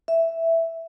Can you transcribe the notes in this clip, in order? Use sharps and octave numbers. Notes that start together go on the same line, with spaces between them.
E5